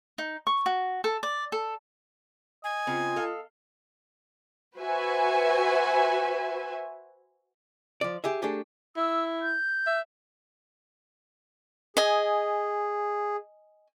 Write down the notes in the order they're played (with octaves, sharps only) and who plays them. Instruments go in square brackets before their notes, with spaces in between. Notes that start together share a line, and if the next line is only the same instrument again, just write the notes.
[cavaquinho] D#4
C#6
F#4
A4
D5
A4
[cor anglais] D#5 [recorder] G#5
[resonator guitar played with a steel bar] C#3 C4 [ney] F4
[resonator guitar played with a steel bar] A4 F5
[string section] F#4 B4 C5 E5 G#5
[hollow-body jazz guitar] F3 D5
G4 G#4 E5
A3 D4 G4 G#4
[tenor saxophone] E4 [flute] E6
[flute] G6
[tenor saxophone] E5
[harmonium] G#4 [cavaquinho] D#5 G#5